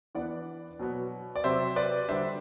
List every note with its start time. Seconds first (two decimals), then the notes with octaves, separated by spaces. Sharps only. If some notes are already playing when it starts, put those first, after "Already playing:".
0.15 E3 B3 D4 D5 F#5
0.79 B2 F#3 B3
1.36 D5
1.44 C3 F#3 C4 C5 E5
1.76 B4 D5
2.09 D3 G3 D4 C5 E5